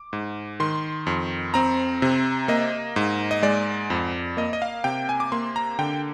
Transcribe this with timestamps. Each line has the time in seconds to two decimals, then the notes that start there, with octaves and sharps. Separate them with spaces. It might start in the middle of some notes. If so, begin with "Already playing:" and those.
Already playing: D6
0.13 G#2
0.60 D#3 C6
1.07 F2
1.54 C4 A#5
2.02 C3
2.48 A#3 D#5
2.96 G#2
3.31 D#5
3.43 G#3 D5
3.90 F2
4.37 A#3 D#5
4.53 D#5
4.62 F5
4.84 C3 G5
5.09 G#5
5.20 D6
5.32 A#3 C6
5.56 A#5
5.79 D3 G5